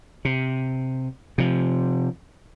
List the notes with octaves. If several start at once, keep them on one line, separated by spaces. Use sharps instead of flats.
C3
C3 F3